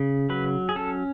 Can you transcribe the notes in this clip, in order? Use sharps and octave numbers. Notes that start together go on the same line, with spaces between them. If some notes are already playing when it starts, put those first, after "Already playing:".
Already playing: C#3
F#3 B4
G#4
C#4 A4